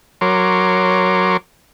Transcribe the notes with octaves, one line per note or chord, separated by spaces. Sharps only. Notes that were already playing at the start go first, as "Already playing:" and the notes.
F#3 A#4 C#5 C6 D6